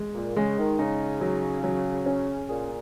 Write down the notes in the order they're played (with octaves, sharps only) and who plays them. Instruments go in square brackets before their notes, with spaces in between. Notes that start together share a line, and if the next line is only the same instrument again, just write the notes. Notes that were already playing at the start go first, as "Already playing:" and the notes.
Already playing: [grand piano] G#3
[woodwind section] A#2
[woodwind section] C#3 [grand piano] G#3
[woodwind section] D#3
[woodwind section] C#3 [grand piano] D#4
[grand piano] F#3
F#3
C#4
[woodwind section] A#2 [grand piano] G#4